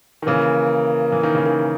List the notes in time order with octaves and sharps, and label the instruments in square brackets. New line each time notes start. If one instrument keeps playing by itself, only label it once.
[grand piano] D#3
[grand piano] C#3 E3 [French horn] A#3
[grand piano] E3
D#3
C#3
D#3